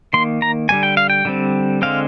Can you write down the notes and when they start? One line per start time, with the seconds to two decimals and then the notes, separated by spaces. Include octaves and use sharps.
0.13 D#3 A#3 C6
0.42 A#5
0.69 D3 G3 A#3 G#5
0.83 G5
0.97 F5
1.10 G5
1.25 D3 G3 C4
1.82 D3 G#3 C4 F5